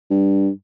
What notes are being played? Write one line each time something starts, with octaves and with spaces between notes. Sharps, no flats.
G2